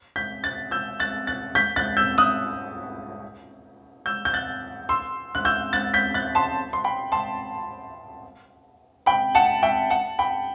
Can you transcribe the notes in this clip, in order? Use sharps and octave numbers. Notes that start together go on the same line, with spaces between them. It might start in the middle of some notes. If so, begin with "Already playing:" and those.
G6 B6
F#6 A6
E6 G6
F#6 A6
F#6 A6
G6 B6
F#6 A6
E6 G6
D#6 F#6
E6 G6
G6
F#6 A6
C6 E6
F#6
E6 G6
F#6 A6
G6 B6
F#6 A6
A5 C6
C6
G5 B5
A5 C6
G5 B5
F#5 A5
E5 G5
F#5 A5
G5 B5